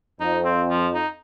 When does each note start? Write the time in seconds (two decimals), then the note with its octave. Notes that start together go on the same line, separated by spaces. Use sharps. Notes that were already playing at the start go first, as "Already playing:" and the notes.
0.21 F2 D#4
0.45 C4
0.70 F3
0.95 D#4